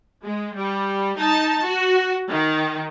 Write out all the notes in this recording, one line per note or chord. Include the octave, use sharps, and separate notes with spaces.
G#3
G3
D#4 A5
F#4
D#3